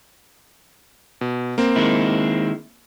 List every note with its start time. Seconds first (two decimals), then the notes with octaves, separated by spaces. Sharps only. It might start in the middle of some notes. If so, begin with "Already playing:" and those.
1.21 B2
1.58 A#3 C4
1.76 D#3 G#3 E4